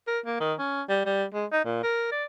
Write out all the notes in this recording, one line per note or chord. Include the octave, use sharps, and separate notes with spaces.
A#4
A#3
D#3
C#4
G3
G3
G#3
D#4
A#2
A#4
D5